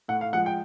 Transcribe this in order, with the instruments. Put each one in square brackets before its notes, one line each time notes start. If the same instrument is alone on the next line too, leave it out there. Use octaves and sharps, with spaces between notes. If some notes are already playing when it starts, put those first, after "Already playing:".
[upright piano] A2 F#5
F5
F3 G#3 F#5
G5